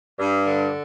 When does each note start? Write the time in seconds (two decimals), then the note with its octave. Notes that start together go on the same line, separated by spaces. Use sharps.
0.19 G2
0.46 D3